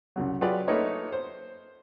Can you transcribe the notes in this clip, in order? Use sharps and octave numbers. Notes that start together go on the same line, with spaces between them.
C2 C#3 F#3
F#3 F4 G4 G#4 B4 D5
A3 A#3 D#4 B4 C#5 D#5
C5